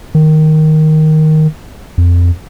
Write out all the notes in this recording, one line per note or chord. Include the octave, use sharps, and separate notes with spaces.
D#3
F2